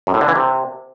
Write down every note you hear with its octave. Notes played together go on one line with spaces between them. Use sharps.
F#2
A2
D3
E3
C3